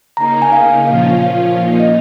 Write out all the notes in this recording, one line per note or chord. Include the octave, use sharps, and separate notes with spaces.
C#3 A#3 D#4 A#5
G#5
F5
A#2 F3 C#4 F4 F5
F5
A#2 A#3 D#4
D#5